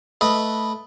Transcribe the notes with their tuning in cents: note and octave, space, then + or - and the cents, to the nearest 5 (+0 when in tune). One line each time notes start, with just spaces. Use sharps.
A3 +0 B4 +0 D#5 +0